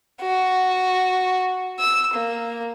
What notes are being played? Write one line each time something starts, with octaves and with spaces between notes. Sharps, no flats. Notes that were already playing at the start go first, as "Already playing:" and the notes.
F#4
E6
A#3